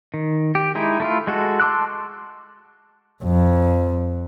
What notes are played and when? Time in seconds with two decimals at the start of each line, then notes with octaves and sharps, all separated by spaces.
0.14 D#3
0.55 G4
0.75 G#3 D#4 E4
1.00 A3 E4 F4
1.27 G#3 F#4 A4
1.60 A5 C6 D6 E6 F#6
3.24 F2